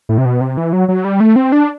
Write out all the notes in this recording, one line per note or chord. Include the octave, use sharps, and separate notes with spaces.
A2
C3
B2
C3
E3
F#3
F#3
G3
A3
C4
D4